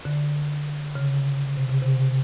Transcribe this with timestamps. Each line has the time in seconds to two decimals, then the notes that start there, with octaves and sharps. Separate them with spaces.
0.05 D3
0.95 C#3
1.57 C3
1.69 C#3
1.82 C3